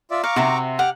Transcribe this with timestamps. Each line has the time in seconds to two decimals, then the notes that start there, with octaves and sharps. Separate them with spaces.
0.11 F4 D5 E5
0.24 F5 A#5 C#6 D6
0.36 C3 F#4 C5 E5
0.79 G4 F#5 D6 F6